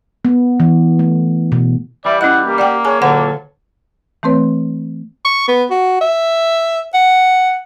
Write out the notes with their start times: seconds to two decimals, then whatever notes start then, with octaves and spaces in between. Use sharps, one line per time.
0.25 B3
0.60 E3
0.99 A3
1.52 B2
2.05 E3 G3 D5 E5
2.21 C#4 E4 D#5 F#5
2.45 A#3 G4
2.58 D5 F#5 G5
2.85 G#4 C#5 G#5 A5
3.02 A#2 D3 F#3 A4 C#5 F#5
4.23 E3 A3 C4 B4 C#5
5.25 C#6
5.48 B3
5.70 F#4
6.01 E5
6.94 F#5